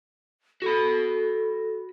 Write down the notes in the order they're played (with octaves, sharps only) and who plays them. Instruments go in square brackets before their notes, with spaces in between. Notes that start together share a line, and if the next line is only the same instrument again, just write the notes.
[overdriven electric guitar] F#4 B5 [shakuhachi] A4